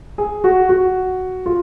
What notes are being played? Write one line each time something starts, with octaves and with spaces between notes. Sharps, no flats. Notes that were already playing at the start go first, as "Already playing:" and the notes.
G#4
F#4
F#4
F4